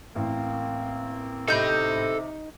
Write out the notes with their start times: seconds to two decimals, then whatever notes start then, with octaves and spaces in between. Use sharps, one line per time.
0.15 A1 A#3 C4
1.48 C3 D#4 A4 B5 G6